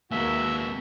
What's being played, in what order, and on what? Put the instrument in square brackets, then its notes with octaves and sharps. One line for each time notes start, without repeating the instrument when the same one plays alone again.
[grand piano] D#2 [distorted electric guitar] G#3 B3 [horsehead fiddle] F#4 A#4 [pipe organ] E5